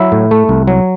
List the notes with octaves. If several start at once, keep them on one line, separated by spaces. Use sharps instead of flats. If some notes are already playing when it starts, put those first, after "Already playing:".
Already playing: F#3 E4 E5
A2
A3
C2
F#3